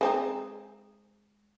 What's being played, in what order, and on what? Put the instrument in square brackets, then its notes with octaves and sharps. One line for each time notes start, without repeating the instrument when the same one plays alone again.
[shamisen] G#3 C4 D#4